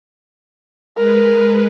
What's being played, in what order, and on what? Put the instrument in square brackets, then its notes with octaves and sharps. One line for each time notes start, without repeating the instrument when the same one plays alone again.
[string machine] G#3 B4 [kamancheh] A#4